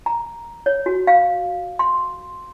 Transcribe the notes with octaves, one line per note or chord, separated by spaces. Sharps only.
A#5
C#5
F#4
F5
C6